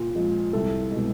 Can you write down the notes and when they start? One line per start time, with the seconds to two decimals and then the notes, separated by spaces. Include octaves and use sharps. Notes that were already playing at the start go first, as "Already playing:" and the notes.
Already playing: A#2
0.15 F3 G#3
0.53 C2 A4
0.91 B2 G#3